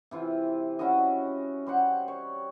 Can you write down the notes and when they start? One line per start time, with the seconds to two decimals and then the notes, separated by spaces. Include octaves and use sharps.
0.11 C3 E3 F4
0.79 C#4 E4 F#4 D#5
1.66 G3 C5 F#5
2.08 C#5